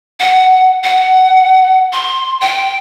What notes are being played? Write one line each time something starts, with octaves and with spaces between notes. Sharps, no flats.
F#5
F#5
C6
G5